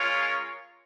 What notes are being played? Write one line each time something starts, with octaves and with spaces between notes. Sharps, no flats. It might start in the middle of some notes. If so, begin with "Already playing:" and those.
Already playing: G#3 C#4 F4 A#4 C#5